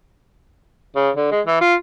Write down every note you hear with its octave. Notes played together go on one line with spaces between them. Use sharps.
C#3
D3
G#3
E3
F4